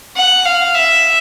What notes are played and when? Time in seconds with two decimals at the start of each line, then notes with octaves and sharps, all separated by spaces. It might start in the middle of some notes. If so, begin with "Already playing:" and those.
0.16 F#5
0.45 F5
0.75 E5